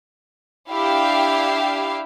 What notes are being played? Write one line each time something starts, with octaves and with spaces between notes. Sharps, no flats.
D4 E4 G4 F5 G5